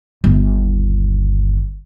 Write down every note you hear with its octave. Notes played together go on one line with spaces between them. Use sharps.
G1 D#2